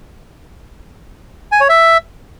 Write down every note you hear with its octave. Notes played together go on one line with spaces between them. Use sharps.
G#5
C#5
E5